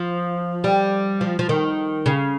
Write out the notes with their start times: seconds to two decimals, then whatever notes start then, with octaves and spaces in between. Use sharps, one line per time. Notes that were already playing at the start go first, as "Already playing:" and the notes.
Already playing: F3
0.64 G3
1.21 F3
1.39 F3
1.49 D#3
2.06 C#3